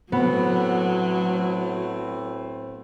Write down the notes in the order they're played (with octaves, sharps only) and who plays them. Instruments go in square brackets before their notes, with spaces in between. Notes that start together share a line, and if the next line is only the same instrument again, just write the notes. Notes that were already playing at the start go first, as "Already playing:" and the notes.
[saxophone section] A2 C4 [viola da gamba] F#3 [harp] B3